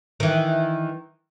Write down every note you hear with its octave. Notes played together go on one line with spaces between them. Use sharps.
D#3 E3